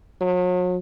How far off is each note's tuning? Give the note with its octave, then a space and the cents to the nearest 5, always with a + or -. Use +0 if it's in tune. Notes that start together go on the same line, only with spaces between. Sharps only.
F#3 -40